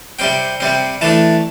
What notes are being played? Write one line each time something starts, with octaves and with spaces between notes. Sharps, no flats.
C3 G3 C4 G5
C3 G3 C4
E3 A3 D4 A5